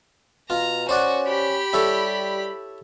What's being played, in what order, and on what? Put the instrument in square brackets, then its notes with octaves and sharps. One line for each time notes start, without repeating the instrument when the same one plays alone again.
[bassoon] B2 [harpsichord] F4 [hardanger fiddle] A#5
[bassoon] C#4 [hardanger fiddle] F#4 [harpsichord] C5 D5 F#5
[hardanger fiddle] G4 B5
[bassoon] G3 [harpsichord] E4 A4 C#5